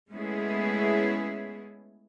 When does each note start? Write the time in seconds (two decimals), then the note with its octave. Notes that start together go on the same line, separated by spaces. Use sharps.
0.10 G#3 A3 B3 C#4 E4 G#4